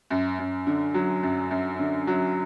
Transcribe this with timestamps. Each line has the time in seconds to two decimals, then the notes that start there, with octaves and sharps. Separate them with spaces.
0.10 F#2
0.39 F#2
0.67 D3
0.94 F#3
1.23 F#2
1.51 F#2
1.79 D3
2.07 F#3